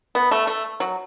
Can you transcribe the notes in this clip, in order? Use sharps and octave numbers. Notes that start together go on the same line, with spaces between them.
B3
A3
A3
F#3